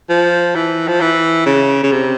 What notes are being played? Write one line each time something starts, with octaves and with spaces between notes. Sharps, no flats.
F3
E3
F3
E3
C#3
C#3
C3